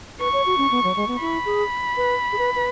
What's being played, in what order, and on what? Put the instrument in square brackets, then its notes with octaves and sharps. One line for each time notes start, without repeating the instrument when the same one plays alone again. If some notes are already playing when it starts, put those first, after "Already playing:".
[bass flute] B4 [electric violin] C#6
[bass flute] C#5
F#4
C#4
B3
F#3
G#3
B3
[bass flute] E4 [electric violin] B5
[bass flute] G#4
B4
G#4
B4
B4